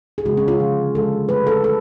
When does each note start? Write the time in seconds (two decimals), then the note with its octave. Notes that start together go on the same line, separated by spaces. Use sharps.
0.18 G#4
0.25 C#3 F3 G#3 F#4
0.37 C#4
0.48 F4
0.60 D3 F3 G#3
0.95 D3 F3 G#3 A4
1.29 D3 F#3 A3 B4
1.47 A4
1.63 D3 F#3 A3 A4